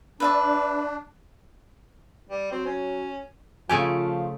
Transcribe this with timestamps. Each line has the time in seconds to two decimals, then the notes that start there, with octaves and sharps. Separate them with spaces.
0.20 D4 B4 E5 A5
2.30 G3
2.52 F#3 C4
2.66 C#4
3.70 C#3 F3 A3 F4 G4 G#5